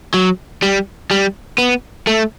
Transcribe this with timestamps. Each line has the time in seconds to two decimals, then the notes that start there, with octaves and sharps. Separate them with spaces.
0.14 F#3
0.62 G3
1.11 G3
1.58 B3
2.07 A3